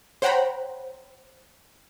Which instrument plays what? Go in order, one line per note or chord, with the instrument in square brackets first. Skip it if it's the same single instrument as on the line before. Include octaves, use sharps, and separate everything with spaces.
[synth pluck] C5 C#5 F#5 G5 A#5 B5